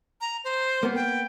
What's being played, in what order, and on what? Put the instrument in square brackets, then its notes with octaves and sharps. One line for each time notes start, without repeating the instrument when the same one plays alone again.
[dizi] A#5
C5
[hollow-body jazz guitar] A#3 B3
[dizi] G5